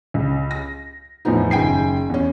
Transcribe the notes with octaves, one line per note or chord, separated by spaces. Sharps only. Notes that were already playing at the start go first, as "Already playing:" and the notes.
C#2
A#6
E2 A2 F3 B3 D#4
F#1 D#3 G5 G#5 C7
E2 C#4